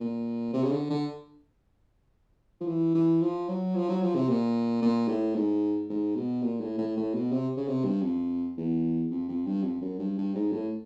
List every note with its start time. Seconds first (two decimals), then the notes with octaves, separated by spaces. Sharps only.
0.01 A#2
0.53 C3
0.64 C#3
0.72 D3
0.90 D3
2.61 F3
2.68 E3
2.95 E3
3.22 F3
3.49 F#3
3.75 F3
3.89 F#3
4.02 F3
4.15 C3
4.29 A#2
4.82 A#2
5.08 A2
5.35 G#2
5.90 G#2
6.15 B2
6.42 A#2
6.60 A2
6.78 A2
6.97 A2
7.14 B2
7.32 C3
7.57 C#3
7.68 C3
7.85 G2
8.03 F2
8.57 E2
9.11 F2
9.29 F2
9.46 G2
9.63 F2
9.82 F#2
9.99 G2
10.18 G2
10.36 G#2
10.52 A2